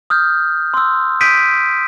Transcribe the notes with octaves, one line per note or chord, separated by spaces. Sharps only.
D#6 F6 G6
C6 E6
D#6 E6 G6 B6 D7 D#7